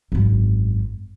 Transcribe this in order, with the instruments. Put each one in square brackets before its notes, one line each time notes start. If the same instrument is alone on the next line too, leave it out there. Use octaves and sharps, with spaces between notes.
[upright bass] G#1 F#2